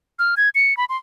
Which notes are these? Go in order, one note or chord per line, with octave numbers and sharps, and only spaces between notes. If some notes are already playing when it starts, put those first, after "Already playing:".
F6
G#6
C#7
B5
C6